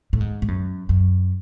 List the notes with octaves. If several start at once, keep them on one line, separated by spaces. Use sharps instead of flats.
A2
G#2
G#2
F#2
F#2